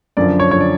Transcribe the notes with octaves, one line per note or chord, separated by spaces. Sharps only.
F#2 D3 F3 D5
C#5
D3 F3 C#5
D5